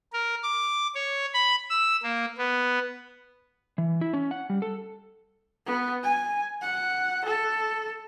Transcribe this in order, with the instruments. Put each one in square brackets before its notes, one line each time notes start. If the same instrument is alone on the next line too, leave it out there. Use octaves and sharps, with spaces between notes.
[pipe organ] A#4
D6
C#5
B5
E6
A#3
B3
[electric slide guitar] E3
E4
C#4
F#5
G3
A4
[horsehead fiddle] B3
G#5
F#5
A4